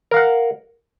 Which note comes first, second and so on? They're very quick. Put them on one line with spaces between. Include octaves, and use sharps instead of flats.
A#4 F5 F#5